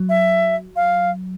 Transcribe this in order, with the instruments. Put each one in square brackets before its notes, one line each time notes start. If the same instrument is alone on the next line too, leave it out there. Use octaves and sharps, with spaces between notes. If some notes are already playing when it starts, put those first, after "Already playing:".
Already playing: [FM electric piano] F#3
[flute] E5
F5